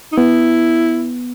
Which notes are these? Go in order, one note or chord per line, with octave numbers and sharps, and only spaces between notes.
D#4
B3 E4